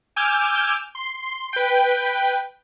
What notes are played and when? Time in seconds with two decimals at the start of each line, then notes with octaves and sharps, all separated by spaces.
0.16 G#5 D6 E6 F6 G6
0.95 C6
1.53 B4 G5